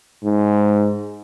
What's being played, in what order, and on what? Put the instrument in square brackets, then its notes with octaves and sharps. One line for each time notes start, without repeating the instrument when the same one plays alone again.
[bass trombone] G#2